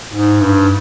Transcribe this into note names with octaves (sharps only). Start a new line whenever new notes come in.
G#2
G2